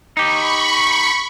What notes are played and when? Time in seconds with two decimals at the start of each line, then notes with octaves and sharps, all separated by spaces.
0.17 D#4 G4 B5 C#6